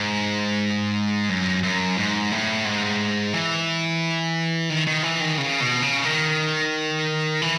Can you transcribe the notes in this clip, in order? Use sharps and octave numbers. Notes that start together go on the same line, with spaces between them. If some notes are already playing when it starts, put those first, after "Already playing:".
Already playing: G#2
F#2
F#2
G#2
A2
G#2
E3
D#3
D#3
E3
D#3
C#3
B2
C#3
D#3
E3